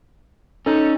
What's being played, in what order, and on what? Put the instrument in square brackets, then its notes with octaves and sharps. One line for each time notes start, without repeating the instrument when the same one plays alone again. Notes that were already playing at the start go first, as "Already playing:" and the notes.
[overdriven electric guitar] C#4 [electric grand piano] D#4 A4